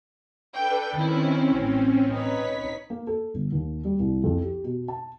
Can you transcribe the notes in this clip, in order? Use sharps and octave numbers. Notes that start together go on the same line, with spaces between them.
D4 A4 B4 G5
D#3 C4 C#4 E4
A1
D#4 B4 C#5 B6
A#3
A4
G1
D#2
G3
C2
F2
G4
B2
A5